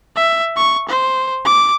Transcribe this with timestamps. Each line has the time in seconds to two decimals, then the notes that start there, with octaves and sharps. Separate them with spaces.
0.16 E5
0.56 C#6
0.89 C5
1.45 D6